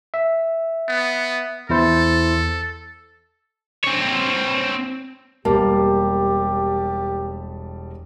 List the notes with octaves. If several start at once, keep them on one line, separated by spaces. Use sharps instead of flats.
E5
B3
E2 E4 A4 C5
C4 C#5
E1 G3 A#3 G4 A5